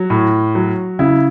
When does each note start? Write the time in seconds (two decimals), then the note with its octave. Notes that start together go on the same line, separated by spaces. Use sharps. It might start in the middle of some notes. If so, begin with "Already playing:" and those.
Already playing: F#3
0.10 A2
0.55 F#3
0.99 C#3 E4